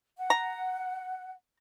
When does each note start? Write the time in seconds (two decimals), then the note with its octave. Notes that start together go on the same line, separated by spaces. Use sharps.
0.17 F#5
0.30 A#5